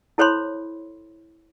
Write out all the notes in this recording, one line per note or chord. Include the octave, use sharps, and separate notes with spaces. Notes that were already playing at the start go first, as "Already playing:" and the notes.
E4 A4 C5 C#5 B5 C6